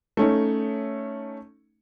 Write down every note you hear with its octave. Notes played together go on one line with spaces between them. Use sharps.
A3 C#4 D#4